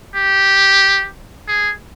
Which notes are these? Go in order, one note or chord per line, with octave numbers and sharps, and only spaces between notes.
G4
G#4